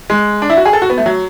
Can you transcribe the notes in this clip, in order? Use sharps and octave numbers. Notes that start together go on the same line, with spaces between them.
G#3
D4
E4
F#4
G#4
A4
F#4
B3
A3
F#3